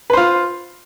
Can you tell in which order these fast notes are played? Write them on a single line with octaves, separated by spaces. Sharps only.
B4 C5 F4